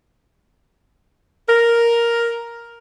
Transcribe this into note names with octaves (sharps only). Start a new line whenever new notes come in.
A#4